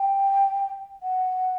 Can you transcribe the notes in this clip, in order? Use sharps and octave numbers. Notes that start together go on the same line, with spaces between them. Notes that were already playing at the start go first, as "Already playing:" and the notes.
Already playing: G5
F#5